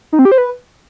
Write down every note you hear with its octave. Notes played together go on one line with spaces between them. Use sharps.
D#4
C4
G4
C5
B4